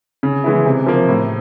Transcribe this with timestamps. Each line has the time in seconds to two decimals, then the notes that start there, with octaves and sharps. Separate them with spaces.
0.23 C#3
0.44 E3 G#3 B3 E4
0.66 C3
0.86 F3 A#3
1.09 A2